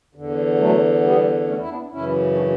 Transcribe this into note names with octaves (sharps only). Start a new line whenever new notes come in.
E2 D3
F#3 A3
G3 B3
A3 C#4
E4
B3 D4
F#2 C#3 E3 C#4 E4
D4 F#4